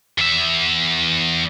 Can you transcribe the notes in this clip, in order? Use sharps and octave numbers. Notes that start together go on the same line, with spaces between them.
E2 E5